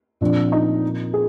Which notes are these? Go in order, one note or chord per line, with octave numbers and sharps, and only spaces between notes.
A#2 F3 C4 D4
D#4
G#4